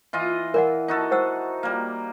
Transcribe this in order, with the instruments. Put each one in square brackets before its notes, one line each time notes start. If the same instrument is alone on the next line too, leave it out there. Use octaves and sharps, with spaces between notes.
[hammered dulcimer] E3 F4 D#5
[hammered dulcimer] E3 [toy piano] A#4 D5 F#5
[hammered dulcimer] D#4 F#4 A4
[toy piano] C5 F#5 E6
[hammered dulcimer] G3 A#3